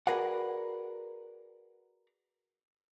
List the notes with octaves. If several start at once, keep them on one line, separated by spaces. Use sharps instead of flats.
F#4 G#4 A#4 B4 D5 F#5